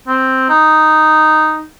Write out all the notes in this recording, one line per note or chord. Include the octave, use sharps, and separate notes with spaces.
C4
D#4